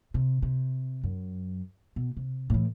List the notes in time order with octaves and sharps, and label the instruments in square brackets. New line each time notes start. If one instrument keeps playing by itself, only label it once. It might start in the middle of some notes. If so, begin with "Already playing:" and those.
[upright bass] C3
C3
F#2
B2
C3
A2 E3